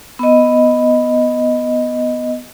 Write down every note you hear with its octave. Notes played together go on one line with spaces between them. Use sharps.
B3 D#5